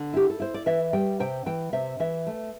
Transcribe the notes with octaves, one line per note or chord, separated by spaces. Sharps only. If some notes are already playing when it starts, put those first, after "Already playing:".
Already playing: D3 D5
E4 G4
A4
E4 C5
D5
E3 E5
G3 G5
C3 G5
E3 G5
C3 E5
E3 E5
A3